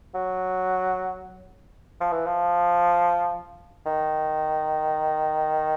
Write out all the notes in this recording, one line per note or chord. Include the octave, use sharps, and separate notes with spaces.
F#3
F3
E3
F3
D#3